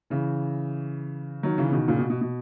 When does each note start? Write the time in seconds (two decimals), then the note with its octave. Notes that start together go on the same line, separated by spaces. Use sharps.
0.10 C#3 E3
1.43 D#3 F#3
1.58 C#3 E3
1.69 C#3
1.72 B2 D#3
1.88 A#2 C#3
1.98 B2
2.10 B2
2.21 B2